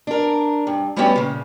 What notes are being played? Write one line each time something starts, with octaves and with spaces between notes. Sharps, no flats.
D4 A#4
G2
G3 A3 B3 C#4 F#4 G4
A#2 C#3